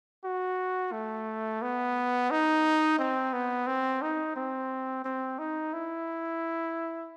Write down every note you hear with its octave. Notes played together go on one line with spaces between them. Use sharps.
F#4
A3
B3
D#4
C4
B3
C4
D#4
C4
C4
D#4
E4